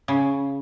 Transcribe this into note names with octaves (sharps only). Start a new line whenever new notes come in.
C#3